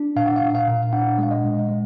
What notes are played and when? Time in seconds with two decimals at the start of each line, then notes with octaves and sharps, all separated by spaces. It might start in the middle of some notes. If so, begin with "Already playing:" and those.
Already playing: D4
0.16 A#2 F5
0.26 F#5
0.36 F5
0.42 A#2
0.55 F5
0.68 A#2
0.93 D4 F#5
1.18 G#3 F5
1.31 D#5
1.44 A#2
1.69 G#3